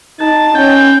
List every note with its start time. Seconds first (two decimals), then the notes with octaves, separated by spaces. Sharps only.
0.20 D#4 A5
0.54 C#4 G5